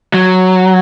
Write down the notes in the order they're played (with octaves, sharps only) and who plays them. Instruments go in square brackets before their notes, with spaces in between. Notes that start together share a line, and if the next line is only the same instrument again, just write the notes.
[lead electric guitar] F#3